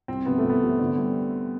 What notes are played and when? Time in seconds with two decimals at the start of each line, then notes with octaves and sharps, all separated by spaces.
0.08 C2 C4
0.26 C3 F3 B3
0.38 A3
0.44 C2
0.50 B3
0.63 C3 F3
0.79 D3
0.97 G3 C4